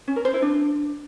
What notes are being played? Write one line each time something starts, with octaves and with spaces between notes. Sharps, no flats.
C#4
A#4
C5
E4
D4